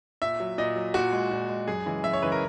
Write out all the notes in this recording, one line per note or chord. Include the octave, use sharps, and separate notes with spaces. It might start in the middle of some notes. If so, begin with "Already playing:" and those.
A#2 E5
F#3
A#2 D#5
F#3
A#2 F#4
G#3
A#2
G#3
F#2 G#4
C#3 E3 G#3
F#2 E5
C#5
C#3 E3 G#3 B4
A#4